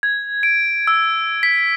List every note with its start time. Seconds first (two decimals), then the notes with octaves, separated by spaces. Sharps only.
0.03 G#6
0.43 D7
0.87 E6
1.43 B6